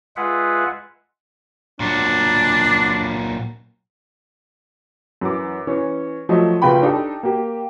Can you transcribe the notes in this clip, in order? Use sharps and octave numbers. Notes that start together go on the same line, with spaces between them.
G#3 F4 G#4 B4 E5 F#5
A#2 F#3 D4
F#2 E3 D6
E3 C#4
F3 F#3 A3 D#5
F#1 F4 B4 G5 B5
D4 D#4 G4 A4
A#3 G4